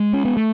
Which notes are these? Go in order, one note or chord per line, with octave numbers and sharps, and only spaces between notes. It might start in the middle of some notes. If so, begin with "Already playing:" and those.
Already playing: G#3
C#4
B3
A3